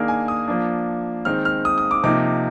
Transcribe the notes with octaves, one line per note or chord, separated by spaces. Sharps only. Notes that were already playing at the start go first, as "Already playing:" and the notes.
Already playing: D#3 A#3 D4 G#4 A#4
G#5
D#6
F3 A#3 D4
D#3 G#3 C4 D#4 F6
F6
D#6
D#6
D6
C3 F3 A#3 D#4 D6